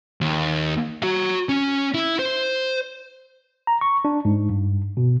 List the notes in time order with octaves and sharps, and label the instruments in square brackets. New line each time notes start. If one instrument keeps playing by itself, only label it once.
[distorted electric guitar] D#2
F#4 A#5
C#4
E4
C5
[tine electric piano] A#5
C#6
D4
G#2
G2
B2